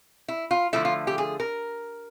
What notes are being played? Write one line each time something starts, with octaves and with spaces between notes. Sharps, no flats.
E4
F4
D3 F3 A3 E4
F4
G4
G#4
A#4